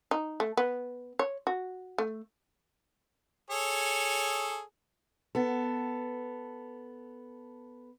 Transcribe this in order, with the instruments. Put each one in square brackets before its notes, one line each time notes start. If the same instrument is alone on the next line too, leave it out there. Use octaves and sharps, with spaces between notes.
[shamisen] D#4
A3
B3
C#5
F#4
A3
[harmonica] G#4 A4 C#5
[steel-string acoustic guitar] B3 A4